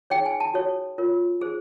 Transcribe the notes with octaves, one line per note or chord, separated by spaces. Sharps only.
D#4 G#4 C#5 G5
G#5
A5
F#4 A4 C#5
F4 A#4 C#5
D#4 G#4 C5